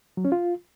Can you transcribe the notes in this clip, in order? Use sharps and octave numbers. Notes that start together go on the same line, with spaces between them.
F#3
C#4
F4